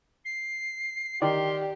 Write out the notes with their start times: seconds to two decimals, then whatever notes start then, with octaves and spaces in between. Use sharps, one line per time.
0.24 C7
1.22 D#3 G4 D5 C6